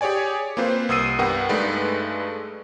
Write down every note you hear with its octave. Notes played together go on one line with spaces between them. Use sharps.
G4 G#4 C#5 D5 G#5
A#3 C4 F4 B4 C5
C2 D#6 E6 C7 D#7
G2 B3 A#4 F#5 G5
G2 G#3 A3 D#4 B4 D5